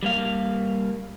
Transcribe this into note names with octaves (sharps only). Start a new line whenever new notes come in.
G3 A#3 F5